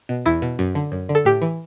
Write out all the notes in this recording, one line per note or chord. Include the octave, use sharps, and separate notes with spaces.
B2
E2 E4
B2
F#2
D3
F#2
D3
A4
A2 G4
E3